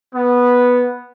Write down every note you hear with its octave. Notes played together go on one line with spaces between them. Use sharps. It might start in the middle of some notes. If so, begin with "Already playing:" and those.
B3